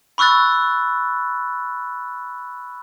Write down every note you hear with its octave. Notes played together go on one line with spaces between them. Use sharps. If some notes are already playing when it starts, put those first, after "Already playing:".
B5 C#6 E6 F#6 A6